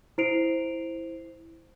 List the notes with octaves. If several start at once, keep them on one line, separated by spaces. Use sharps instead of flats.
E4 C5 C7 D7 F7